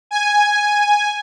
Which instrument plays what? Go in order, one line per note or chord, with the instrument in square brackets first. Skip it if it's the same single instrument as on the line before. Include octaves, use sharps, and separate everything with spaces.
[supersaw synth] G#5